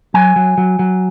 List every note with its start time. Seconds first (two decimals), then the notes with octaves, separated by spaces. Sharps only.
0.14 F#3 G#5
0.36 F#3
0.58 F#3
0.79 F#3